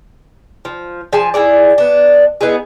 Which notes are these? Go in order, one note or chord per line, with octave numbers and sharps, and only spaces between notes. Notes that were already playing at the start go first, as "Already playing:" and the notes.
F3
F3 G#4 G#5 A5
E4 F#4 G#4 D5
B3 D4
B3 D#4 E4 G#4